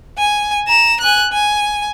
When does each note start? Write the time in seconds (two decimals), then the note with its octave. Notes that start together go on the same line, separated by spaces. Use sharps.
0.18 G#5
0.67 A#5 E7
1.01 G#5 F#6
1.32 G#5